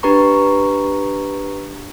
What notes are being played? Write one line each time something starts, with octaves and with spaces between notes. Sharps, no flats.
D4 G4 B4 A#5 C#6